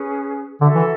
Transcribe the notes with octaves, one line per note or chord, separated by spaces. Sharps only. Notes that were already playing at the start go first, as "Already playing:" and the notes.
Already playing: C#4 G#4 B4
D3 F#4 A4 E5
E3